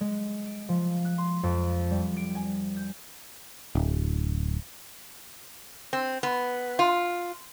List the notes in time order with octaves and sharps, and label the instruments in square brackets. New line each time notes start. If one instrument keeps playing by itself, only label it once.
[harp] G#3
D7
F3
F#6
C6
F2
G3
D7
G#5
G6
[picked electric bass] D1
[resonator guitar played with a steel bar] C4
B3
F4